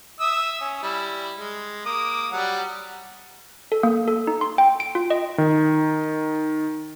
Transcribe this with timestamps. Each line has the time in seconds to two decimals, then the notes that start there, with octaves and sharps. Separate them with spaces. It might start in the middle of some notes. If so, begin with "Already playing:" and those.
0.20 E5 D#6 E6
0.61 C#4
0.83 G3 E4
1.39 G#3
1.86 A#3 D6 D#6
2.32 F#3 G3 F#5
3.72 A4
3.83 A#3
4.08 A4
4.27 D#4
4.41 C6
4.58 G5
4.80 D7
4.95 F4
5.10 D#5
5.38 D#3